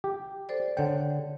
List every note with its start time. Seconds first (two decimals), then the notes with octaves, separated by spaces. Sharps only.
0.04 G4
0.49 A4 C5 D5
0.77 D3 C5 C#5 F#5 G5